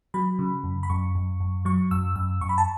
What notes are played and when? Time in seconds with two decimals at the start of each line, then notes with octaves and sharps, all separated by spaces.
0.14 F#3 B5
0.39 C#3
0.64 F#2
0.83 B5
0.90 F#2 C#6
1.15 F#2
1.40 F#2
1.65 F#3 C#6
1.91 F#2 E6
2.16 F#2 E6
2.41 F#2 C#6
2.49 B5
2.58 A5